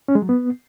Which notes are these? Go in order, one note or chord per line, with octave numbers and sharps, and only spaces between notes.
C#4
G#3
F#3
B3